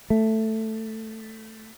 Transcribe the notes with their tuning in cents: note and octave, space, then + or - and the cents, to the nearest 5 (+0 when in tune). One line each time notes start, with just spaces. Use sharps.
A3 +5